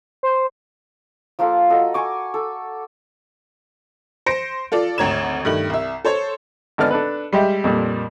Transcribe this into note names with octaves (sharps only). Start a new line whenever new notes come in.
C5
F3 A#3 F4 A4
F#4 A4 D#5 F#5
G#5 C#6 D6
A4
C5 A#6 C#7 D7
F4 A4 D5
G#1 D2 C#5 A#5 G#6 E7
G2 D#3 A3 F#7
C2 E5
A4 C5 C#5
G#1 D3 B3 D5 F6
D4 A4 B4
G3 G#3 G4 E5
F2 A#2 G3